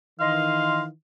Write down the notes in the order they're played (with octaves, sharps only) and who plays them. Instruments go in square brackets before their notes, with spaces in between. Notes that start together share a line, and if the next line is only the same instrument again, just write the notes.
[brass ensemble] D#3 E3 [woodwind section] D#5 C6 [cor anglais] F5